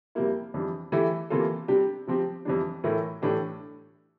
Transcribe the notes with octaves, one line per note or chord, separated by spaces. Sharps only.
F2 C3 G3 A#3 E4
F2 E3 G3 D4
E3 A3 E4 G4
C3 E3 A#3 F4 A4
C3 G3 D4 G4
C3 F3 C4 G4
F2 C3 E3 G3 D4
A2 E3 A3 E4 A#4
A2 E3 A3 D4 G4